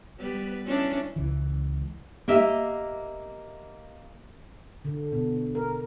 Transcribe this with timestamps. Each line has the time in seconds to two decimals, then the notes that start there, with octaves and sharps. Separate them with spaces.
0.18 G3 B3 B4
0.65 C#4 D4 E4
1.16 C#2 E3
2.28 A#3 G4 D#5 E5
4.85 D3
5.12 B2
5.55 A#4